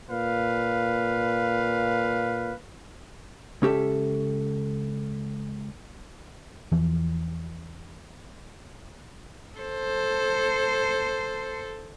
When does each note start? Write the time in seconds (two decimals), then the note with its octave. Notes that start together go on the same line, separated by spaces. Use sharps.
0.10 A#2 B4 F5
3.62 C#2 C#4 G4 A4 E5
6.72 E2 E3 F3
9.58 A4 C5